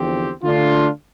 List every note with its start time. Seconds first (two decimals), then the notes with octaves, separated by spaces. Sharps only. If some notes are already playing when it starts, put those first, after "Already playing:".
Already playing: E2 D3 F3 C4 G4
0.43 D3 A3 D4 F4